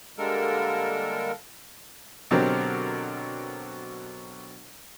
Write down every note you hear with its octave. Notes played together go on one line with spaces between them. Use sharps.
D3 G3 G#3 A#3 A4 A#4
B2 D3 F#3 C4 G4 A#4